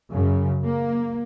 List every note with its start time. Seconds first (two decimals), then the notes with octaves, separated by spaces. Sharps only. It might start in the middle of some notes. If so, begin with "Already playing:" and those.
0.10 F#2 C#3
0.63 A#3